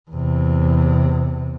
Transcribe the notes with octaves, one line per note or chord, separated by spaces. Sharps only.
E2 C3